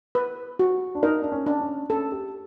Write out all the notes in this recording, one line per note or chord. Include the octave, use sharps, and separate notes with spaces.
B4
F#4
D4
D#4 A#4
D4
C#4
D4
C#4
C#4 A4
G4